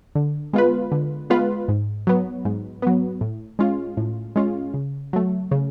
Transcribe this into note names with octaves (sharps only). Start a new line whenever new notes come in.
D3
G#3 B3 F4 B4
D3
G#3 B3 F4 B4
G#2
F#3 B3
G#2
F#3 B3
A2
G#3 C#4 F4
A2
G#3 C#4 F4
C#3
F#3 A3
C#3